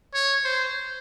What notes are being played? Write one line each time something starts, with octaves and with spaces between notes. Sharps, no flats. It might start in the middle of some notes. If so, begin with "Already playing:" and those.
C#5
C5